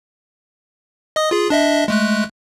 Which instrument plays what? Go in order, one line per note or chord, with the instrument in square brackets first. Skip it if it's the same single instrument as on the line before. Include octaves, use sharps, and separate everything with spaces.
[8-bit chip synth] D#5 D#6
F4 G#4
D4 D#5 E5
G#3 A3 F#6